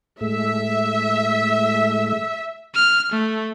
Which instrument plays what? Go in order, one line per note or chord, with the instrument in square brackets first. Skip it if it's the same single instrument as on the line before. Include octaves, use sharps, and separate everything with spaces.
[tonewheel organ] A2 G#3 A3 [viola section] E5
[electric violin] F6
A3